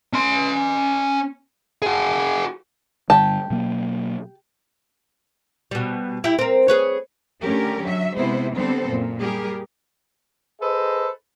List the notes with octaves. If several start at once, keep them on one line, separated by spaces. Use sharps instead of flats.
C#4 C6
F#4 G#4
G2 D3 G3 G4 A5
B2 F#3 A#3
B2 G3
E4 G4
C4 A#4
G#4 B4 C#5
D3 A3 C#4 G4 A#4
F#3 E5
C3 G#3 B3 E4 C5
D3 G3 B3 C4 A4 C5
F#2 A#2
G3 G4 G#4 A#4
G#4 A4 B4 C5 D#5